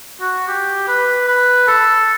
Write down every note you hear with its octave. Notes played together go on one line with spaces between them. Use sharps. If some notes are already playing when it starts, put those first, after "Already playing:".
F#4
G4
B4
B4
A4